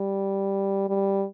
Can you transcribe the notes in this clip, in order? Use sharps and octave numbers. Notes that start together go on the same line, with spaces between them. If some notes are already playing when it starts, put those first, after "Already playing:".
Already playing: G3
G3